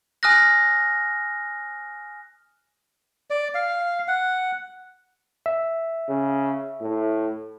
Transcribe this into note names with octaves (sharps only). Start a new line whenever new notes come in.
G#5 D#6 F6 F#6 A#6
D5
F5
F#5
E5
C#3
A2